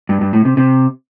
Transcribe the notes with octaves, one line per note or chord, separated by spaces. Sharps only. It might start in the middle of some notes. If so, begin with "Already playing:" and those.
G2
G2
A2
C3
C3